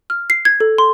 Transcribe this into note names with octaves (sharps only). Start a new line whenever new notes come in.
F6
C7
G#6
A4
C6